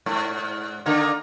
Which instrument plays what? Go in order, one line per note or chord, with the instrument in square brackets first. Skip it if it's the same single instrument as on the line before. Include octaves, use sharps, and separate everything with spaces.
[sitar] G#2
D3 A#3 D#4